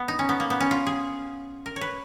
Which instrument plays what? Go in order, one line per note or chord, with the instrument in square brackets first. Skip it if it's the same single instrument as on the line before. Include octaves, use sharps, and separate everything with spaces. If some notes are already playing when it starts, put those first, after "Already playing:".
Already playing: [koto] B3
D#4
C#4
B3
A#3
B3
C#4
F4
G#4
A#4
C#5
B4